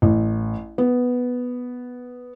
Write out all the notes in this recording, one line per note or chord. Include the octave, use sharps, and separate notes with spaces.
A1
B3